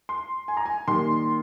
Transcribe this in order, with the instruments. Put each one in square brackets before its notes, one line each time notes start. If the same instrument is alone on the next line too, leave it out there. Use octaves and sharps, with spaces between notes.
[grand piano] C6
G#5
A#5
G#5
D#3 G3 A#3 C6